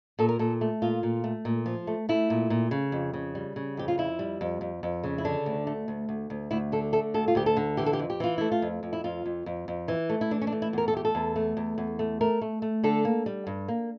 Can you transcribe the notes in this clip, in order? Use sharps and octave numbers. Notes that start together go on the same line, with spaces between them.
A#2 A4
A#4
A#2 A4
A3
A#2 F4
A#2
A3
A#2
F3
A3
A3 E4
A#2
A#2
C#3
F2
C#3
G3
C#3
F2 G4
F4
F2 E4
G3
F2
F2
F2
C#3
E4
D3 D4
D2
A3
D2
D2
D2
D2 E4
D3 A4
A3 A4
D2 A4
F4
D2 G4
A4
D3
E3 G4
A4
G4
F2
G4
E3 F4
A3 E4
F4
F2
F2
E4
F2 F4
F2
F2
F2
E3
A3
E4
E3 D4
C#4
D4
A3
E4
E2 A#4
A4
A3 G4
A4
E2
A3
E2
E2
A3
A3 A#4
A3
A3
D3 A4
A#3
G3
G2
A#3